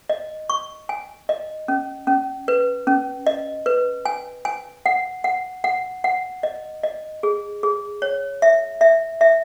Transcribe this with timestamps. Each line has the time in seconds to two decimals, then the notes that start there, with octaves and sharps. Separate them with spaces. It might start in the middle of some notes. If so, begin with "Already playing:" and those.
0.09 D#5
0.50 C#6
0.89 G#5
1.29 D#5
1.68 C#4
2.07 C#4
2.48 B4
2.87 C#4
3.27 D#5
3.66 B4
4.05 G#5
4.45 G#5
4.86 F#5
5.24 F#5
5.64 F#5
6.04 F#5
6.43 D#5
6.83 D#5
7.23 G#4
7.63 G#4
8.02 C#5
8.42 E5
8.81 E5
9.21 E5